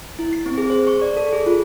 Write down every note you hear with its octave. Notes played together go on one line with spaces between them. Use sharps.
E4
C7
C4
G#4
C5
C#6
D5
A4
G#4
F4